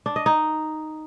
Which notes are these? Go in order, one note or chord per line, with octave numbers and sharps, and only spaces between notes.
D4
D#5
D#4